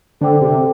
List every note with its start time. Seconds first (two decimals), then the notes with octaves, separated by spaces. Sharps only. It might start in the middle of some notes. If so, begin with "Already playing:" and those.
0.21 D3 A4 C5 G5 D6
0.41 C3